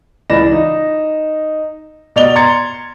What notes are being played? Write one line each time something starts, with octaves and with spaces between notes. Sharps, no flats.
C#2 E3 D5 B5 A#6 E7
D#4
B2 D5 F7 G7
A#5 C6 G#6 A6 C#7